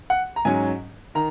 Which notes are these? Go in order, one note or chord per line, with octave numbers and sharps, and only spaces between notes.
F#5
A#5
G#2 F#3 C#4 G#5
D#3 A#5